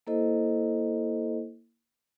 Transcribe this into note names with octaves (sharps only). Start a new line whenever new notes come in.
A#3 E4 A4 C5 D#5